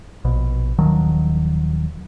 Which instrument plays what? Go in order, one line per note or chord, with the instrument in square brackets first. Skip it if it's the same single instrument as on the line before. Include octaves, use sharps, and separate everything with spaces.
[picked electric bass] A#1 B2
D#1 D#3 F3 F#3